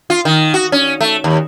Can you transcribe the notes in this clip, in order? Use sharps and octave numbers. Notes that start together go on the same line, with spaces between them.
F4
D#3
F#4
C#4
A3
D#2